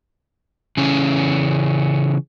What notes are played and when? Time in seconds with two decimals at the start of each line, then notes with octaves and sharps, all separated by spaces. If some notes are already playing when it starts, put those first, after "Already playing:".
0.77 C#3 E3 C#4